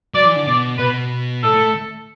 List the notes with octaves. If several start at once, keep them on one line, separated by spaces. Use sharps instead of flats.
F#3 D5
E3
D3
B2 D5
B2 B4
A2 A4
A3